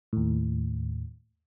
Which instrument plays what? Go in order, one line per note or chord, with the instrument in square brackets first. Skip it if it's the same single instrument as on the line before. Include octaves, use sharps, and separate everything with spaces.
[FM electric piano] D#2 A2